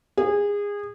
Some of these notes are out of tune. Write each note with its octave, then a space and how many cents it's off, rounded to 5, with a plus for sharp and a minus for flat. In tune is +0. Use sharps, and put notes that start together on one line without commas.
G#4 -25